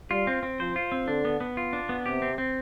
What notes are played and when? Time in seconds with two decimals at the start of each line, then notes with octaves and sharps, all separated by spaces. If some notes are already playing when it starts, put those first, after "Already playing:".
0.10 G3 F4
0.27 C4
0.43 C4
0.59 F3 C5
0.76 F4
0.92 C4
1.08 D3 D4
1.25 B3
1.41 B3
1.57 F4
1.73 D4
1.89 B3
2.06 C3 G4
2.22 C4
2.38 C4